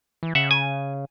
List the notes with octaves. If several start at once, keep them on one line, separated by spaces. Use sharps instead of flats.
E3
C#3 E5 F#5
G#5